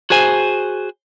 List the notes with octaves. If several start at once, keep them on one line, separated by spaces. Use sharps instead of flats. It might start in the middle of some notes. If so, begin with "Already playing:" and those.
F#4 G#4 C5 G#5